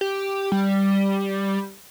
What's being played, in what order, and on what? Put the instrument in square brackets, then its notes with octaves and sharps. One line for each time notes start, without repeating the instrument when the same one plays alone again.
[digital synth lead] G4
G3